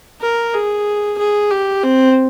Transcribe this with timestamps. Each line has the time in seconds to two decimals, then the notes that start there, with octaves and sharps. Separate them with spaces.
0.21 A#4
0.54 G#4
1.18 G#4
1.51 G4
1.83 C4